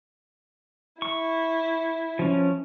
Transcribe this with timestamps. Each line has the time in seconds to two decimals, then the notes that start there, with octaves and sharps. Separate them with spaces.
1.02 E4 C#6
2.19 F3 C#4